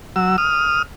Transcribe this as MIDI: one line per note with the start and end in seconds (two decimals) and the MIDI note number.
0.16 0.36 54
0.16 0.36 88
0.38 0.82 87
0.38 0.82 89